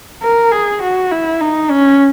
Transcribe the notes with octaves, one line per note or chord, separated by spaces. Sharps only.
A#4
G#4
F#4
E4
D#4
C#4